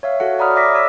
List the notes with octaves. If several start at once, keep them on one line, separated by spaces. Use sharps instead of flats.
C#5 E5 F5
F#4 A4 F#5
C#5 D5 A#5 B5 D#6 F6
D5 E5 D6 A#6 B6
C#5 E6